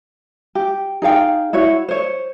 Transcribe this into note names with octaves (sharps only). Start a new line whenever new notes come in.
G4
D#4 G#4 F5 G5
E4 F#4 C#5
C5 C#5